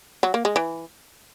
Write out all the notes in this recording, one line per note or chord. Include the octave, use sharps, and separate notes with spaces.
F#3
A#3
G#3
E3